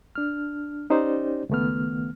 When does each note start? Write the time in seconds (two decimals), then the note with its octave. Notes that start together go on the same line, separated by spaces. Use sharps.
0.15 D4 F6
0.90 C#4 D#4 G4 C5 D5
1.49 C#2 D#3 A3 B3 F6